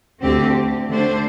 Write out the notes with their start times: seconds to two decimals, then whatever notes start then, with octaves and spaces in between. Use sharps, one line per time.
0.21 D2 D3 C4 G4
0.89 D3 A3 D4 C5